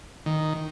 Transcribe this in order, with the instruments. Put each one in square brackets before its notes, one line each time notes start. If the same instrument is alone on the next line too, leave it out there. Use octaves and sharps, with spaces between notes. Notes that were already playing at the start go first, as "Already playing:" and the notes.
[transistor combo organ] D#3